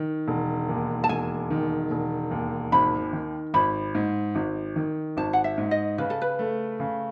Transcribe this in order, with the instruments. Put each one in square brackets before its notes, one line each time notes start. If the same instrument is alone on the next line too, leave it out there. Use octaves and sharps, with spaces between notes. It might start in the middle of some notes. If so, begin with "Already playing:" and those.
Already playing: [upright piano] D#3
E1
D#2
[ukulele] A5
[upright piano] E1 [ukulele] G#5
[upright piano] D#3
E1
D#2
[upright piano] G#1 [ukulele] B5
[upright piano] D#3
[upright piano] G#1 [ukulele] B5
[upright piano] G#2
G#1
D#3
[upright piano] G#1 [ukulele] A5
[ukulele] F#5
E5
[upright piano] G#2
[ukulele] D#5
[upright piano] C#3 [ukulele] B4
[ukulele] A4
B4
[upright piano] A3
C#3